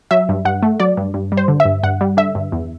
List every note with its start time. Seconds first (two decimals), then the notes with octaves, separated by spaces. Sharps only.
0.11 F#3 E5
0.29 G2
0.45 G2 F#5
0.63 A3
0.80 F#3 D5
0.97 G2
1.14 G2
1.32 G3
1.37 C5
1.48 D3
1.60 E5
1.65 G2
1.83 G2 F#5
2.01 G3
2.17 D3 E5
2.35 G2
2.52 E2